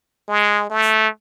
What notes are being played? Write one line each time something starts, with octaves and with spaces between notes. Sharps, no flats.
G#3
A3